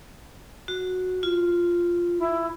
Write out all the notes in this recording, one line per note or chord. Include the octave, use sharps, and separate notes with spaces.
F#4
F4
E4